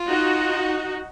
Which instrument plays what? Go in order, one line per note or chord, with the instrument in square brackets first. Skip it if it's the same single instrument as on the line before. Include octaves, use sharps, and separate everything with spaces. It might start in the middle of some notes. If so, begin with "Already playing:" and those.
Already playing: [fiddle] F4
[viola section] D#4 F#4